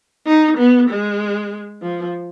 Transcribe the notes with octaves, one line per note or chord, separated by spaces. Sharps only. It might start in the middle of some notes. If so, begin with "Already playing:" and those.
D#4
B3
G#3
F3